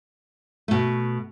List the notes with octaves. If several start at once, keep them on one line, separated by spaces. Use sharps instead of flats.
B2 A3